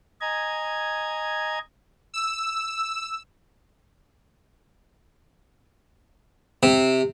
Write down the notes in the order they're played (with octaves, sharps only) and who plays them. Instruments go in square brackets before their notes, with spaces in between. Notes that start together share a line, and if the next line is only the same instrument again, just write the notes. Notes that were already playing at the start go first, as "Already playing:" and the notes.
[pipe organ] D#5 G#5 A#5 G#6
[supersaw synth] E6
[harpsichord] C3